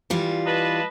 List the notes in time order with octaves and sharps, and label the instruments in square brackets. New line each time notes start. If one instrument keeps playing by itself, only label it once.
[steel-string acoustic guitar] E3 G3 F4
[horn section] B4 D#5 A5